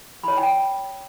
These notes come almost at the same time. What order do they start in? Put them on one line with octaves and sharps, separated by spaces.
B5 C#5 A5 G5